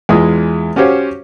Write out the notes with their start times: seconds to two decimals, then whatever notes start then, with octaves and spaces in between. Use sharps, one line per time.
0.09 E2 G#3 E4 F4 G#5 D#6
0.76 C#4 F#4 G4 C5 C#5 F5